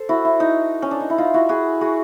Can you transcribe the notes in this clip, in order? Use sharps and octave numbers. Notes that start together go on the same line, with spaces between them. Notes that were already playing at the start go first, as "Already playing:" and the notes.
Already playing: A4 C5
E4 F#4
E4
D#4
C#4
D4
D#4
E4
D#4 F4
E4 F#4
F#4 G#4
F#4 G#4